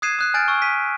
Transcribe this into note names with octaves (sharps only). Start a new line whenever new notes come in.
D#6 F#6 G#6 C7 D#7 E7
D#6 F#6 C7
G#5 F6 G6 A6 D7
C#6 E6
B6 D#7